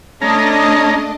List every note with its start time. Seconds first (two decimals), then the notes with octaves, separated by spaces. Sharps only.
0.22 A3 C#4 D4 D#5 A#5